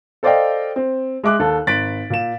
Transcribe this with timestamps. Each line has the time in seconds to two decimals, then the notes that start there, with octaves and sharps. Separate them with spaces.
0.23 A4 C5 D5 D#5 F5 G5
0.76 C4
1.24 G#3 E5 D6 F#6
1.39 D#2 A4 A5
1.67 G#1 F#6 A6 B6 D7 F#7
2.10 A#2 E7